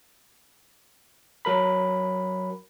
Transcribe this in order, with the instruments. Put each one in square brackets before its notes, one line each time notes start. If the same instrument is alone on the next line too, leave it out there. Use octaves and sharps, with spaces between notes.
[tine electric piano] F#3 A#4 B5